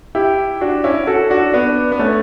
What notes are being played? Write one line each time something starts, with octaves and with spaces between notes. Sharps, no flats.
E4 G4
D4 F#4
C#4 E4
F#4 A4
D4 F#4
B3 D4
B3
A3 C#4